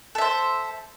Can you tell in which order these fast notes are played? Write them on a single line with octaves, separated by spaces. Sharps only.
A4 E5 C5